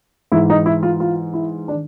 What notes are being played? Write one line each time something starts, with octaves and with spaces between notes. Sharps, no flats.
G#2 E3 E4
D#4
E4
F4
F4
E4
D4
D#3